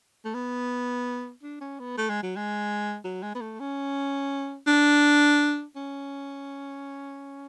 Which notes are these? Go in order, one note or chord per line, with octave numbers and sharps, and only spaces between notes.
A3
B3
D4
C#4
B3
A3
G#3
F#3
G#3
F#3
G#3
B3
A3
C#4
D4
C#4